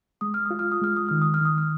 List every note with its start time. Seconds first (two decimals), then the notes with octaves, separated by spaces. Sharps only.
0.21 G#3 D#6
0.34 F6
0.46 F4 D#6
0.59 F6
0.72 D#6
0.81 G#3 F6
0.97 D#6
1.09 D#3 F6
1.22 D#6
1.34 F6
1.41 D#3 D#6
1.58 F6